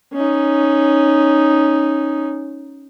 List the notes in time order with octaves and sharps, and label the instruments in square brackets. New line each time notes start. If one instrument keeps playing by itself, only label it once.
[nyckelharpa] C#4 D#4